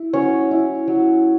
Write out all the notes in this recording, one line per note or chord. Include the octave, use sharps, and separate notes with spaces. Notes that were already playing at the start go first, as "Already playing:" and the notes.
Already playing: E4
F#3 C#4 C#5
E4
F#3